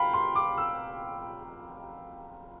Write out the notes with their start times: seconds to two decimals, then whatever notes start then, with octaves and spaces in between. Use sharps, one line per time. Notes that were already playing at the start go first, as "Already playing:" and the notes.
Already playing: F5 G5 B5
0.14 C6
0.35 D6
0.58 E6